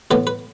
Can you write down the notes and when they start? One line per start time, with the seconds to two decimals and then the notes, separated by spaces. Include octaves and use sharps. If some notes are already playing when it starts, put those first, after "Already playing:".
0.11 A2 E3 B3 B4
0.27 B4